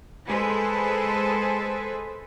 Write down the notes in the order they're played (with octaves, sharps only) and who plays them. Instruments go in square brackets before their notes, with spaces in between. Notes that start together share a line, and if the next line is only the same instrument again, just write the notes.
[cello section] G#3 G#4 A4 B4 C5